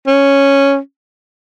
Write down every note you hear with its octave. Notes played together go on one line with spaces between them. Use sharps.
C#4